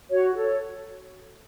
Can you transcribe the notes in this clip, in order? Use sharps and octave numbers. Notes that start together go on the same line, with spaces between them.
F#4 C#5
A4 C#5